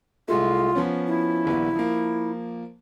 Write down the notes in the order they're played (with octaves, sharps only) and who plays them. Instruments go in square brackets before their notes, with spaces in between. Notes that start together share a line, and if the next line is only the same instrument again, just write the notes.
[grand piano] C2 G#3 A3 [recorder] F4
[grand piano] F3 B3 C#4
[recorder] E4
[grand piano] D#1 A#1 B3
F3 A#3